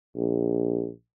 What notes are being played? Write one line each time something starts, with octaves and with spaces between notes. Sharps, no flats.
A#1